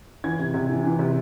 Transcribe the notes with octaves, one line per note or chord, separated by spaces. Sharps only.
E3 G#6
C3
C3
E3
E3
C3